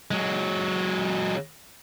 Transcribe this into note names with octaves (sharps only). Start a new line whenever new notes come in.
F#3 G#3